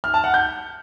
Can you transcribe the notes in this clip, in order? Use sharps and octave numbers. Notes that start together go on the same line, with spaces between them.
F6
A5
F#5
G6